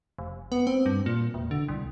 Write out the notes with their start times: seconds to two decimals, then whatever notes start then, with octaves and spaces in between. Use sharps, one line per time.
0.18 F1
0.52 B3
0.67 C4
0.86 G2
1.06 A#2
1.34 E1
1.51 D3
1.68 C2